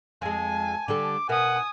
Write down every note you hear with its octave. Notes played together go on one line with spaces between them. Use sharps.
F2 G#3 G#5 A5
D3 G3 A4 D6
B2 A#4 E5 F#5 G#5 D#6